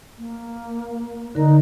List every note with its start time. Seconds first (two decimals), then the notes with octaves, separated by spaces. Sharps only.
0.18 A#3
1.35 D3 D#4 A#4